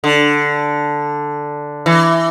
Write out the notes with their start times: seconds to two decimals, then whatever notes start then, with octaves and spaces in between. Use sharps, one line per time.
0.04 D3
1.86 E3